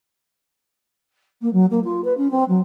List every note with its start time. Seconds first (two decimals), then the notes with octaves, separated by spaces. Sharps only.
1.42 A#3
1.53 F#3
1.71 A#3
1.84 F4
2.04 B4
2.17 C#4
2.31 C4
2.49 F#3